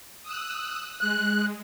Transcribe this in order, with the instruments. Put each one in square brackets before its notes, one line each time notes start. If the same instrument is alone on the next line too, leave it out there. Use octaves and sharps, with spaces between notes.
[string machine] D#6 E6 F#6
[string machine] G#3 [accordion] F#6